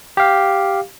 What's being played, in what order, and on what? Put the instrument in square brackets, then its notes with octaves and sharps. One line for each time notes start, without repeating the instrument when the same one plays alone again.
[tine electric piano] G4 F5